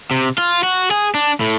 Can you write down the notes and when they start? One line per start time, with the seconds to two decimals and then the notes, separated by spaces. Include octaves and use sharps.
0.11 C3
0.38 F4
0.63 F#4
0.91 G#4
1.15 D4
1.40 A2